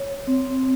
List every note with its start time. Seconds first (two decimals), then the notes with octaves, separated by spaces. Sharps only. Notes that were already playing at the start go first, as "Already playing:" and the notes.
Already playing: C#5
0.27 C4